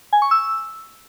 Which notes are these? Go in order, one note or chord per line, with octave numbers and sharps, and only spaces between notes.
G#5
C#6
E6